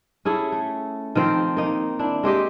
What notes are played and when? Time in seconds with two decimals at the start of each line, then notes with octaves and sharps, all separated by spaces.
0.25 C#4 E4 G#4 A4
0.52 A3
1.15 D#3 F3 C4 C5
1.57 A#3 D#4
1.99 D4 E4
2.23 G#3 C4 G4 D#5